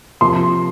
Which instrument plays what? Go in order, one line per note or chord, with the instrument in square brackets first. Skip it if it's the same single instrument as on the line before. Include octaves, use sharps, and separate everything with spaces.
[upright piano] C3 F3 A#3 C6